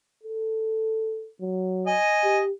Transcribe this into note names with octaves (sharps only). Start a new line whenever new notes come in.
A4
F#3
D#5 G#5
G4